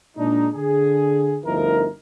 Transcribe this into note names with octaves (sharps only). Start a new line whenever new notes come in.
A#2 G#3 D4 D#4
D3 G#4
G1 D2 F3 D#4 E4 A#4